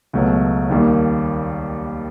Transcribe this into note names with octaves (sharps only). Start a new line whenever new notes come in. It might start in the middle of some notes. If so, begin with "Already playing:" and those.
C#2 B2 F#3 A3
D#2 D#3 G3 A#3